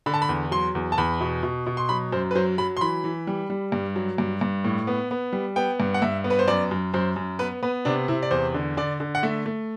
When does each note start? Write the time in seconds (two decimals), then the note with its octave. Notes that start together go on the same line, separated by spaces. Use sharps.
0.06 D3 B5
0.14 A5
0.22 B5
0.29 E2
0.51 F#3 C6
0.75 E2
0.92 A5
0.98 E2 B5
1.21 B2
1.43 B2
1.67 B2
1.77 C6
1.89 F#3 B5
2.12 F#2 C5
2.31 B4
2.35 F#3 C5
2.58 F#3 B5
2.77 C6
2.81 E3 B5
3.04 E3
3.27 G3
3.50 G3
3.72 G2
3.96 F#3
4.18 G2
4.41 G2
4.64 A2
4.87 B3
5.11 B3
5.33 G3
5.56 B3 G5
5.80 G2
5.94 F#5
6.02 G2 E5
6.24 B3
6.30 B4
6.39 C5
6.48 F#2 D5
6.71 F#2
6.94 F#2 C5
7.16 F#2
7.39 B3 B4
7.63 B3 B4
7.85 C3 D4
8.08 C3 E4
8.22 D5
8.31 E2 C5
8.54 D3
8.77 D3 D5
9.00 D3
9.15 F#5
9.23 A3 E5
9.46 A3